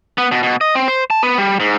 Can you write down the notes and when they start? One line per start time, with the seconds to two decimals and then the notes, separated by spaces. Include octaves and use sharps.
0.18 B3
0.32 B2
0.43 B2
0.61 D#5
0.75 C4
0.88 C5
1.10 A5
1.23 B3
1.38 G3
1.60 G#2